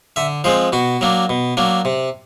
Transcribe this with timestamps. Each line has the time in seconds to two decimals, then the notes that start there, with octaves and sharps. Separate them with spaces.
0.16 D3 E5
0.44 F3 G#3 C4 C5
0.72 B2 F#4
1.01 F#3 A#3 D4
1.29 B2
1.57 F#3 A#3 D4
1.85 C3